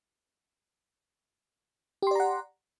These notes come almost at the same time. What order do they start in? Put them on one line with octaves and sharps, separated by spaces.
G4 C6 D5 A#5 F#5